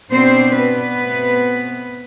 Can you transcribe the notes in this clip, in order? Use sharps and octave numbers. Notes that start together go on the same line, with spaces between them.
B2 B3 C4 D4 C5
B3 B4
B2 A3 C4